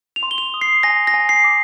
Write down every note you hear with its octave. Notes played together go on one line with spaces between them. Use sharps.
F7
C6
G7
F7
D#6
C7
G#5 A#6
A#6
G#5
C7
D6